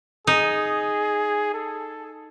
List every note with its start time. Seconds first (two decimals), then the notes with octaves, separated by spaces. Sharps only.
0.27 D#4 G#4
1.54 A4